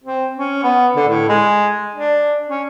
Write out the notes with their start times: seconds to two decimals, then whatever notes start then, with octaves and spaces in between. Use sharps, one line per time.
0.04 C4
0.37 C#4
0.63 B3
0.96 D3
1.08 A2
1.29 G#3
1.95 D4
2.49 C#4